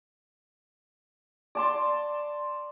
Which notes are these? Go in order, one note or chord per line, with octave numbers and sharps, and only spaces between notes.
D5 A5 C6